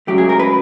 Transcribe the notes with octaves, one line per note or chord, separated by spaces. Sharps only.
C#2 C#3 F#3 A3 G4
G#4
A#4
B4